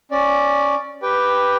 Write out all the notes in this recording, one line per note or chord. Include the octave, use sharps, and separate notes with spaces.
C#4 D5
G4 B4 G5